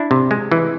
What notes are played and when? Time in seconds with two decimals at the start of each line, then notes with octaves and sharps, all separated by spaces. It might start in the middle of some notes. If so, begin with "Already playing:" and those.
Already playing: D4 E4
0.11 C3
0.31 G#3
0.51 E3